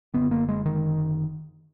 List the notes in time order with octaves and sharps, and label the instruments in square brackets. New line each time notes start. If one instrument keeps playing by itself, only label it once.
[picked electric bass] F#1 F#2 D3 B3
A#3
G#3
D#3